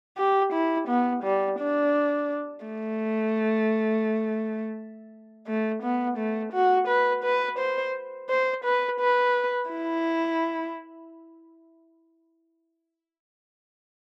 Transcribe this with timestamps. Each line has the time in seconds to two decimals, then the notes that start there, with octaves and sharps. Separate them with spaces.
0.17 G4
0.53 E4
0.88 B3
1.24 G3
1.59 D4
2.65 A3
5.47 A3
5.83 B3
6.17 A3
6.53 F#4
6.88 B4
7.24 B4
7.58 C5
8.29 C5
8.64 B4
9.00 B4
9.70 E4